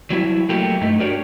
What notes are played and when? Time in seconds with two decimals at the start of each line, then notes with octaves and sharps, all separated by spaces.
0.10 F#3 G3 E4
0.49 F#3 A3 A#3 G4
0.81 G2 A3 D#4
1.00 D4 F#4 G4 A#4 C#5 D5